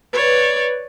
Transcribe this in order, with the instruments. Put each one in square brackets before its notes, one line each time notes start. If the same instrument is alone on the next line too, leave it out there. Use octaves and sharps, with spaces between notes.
[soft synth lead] B4 [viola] C#5 D5